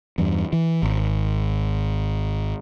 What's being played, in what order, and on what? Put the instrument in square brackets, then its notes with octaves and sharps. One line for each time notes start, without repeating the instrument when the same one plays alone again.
[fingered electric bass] E2 G2
E3
G#1